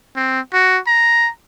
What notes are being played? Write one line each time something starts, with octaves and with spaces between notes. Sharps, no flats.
C4
F#4
A#5